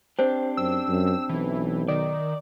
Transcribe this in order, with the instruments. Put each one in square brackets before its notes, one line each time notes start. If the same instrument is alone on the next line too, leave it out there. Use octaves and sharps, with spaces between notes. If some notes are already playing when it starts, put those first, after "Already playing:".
[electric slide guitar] C4 D4 G4 [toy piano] C5
[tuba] F#2 [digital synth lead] E6
[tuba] F#2
[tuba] B1 [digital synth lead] E3
[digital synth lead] D#3 [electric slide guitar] D5